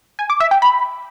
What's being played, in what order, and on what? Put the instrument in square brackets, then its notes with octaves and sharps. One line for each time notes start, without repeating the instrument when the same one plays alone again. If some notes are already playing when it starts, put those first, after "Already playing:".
[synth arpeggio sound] G#5
D6
E5
G5
B5